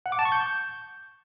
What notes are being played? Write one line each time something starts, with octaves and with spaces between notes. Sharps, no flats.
F#5
D6
A5
C#6
G6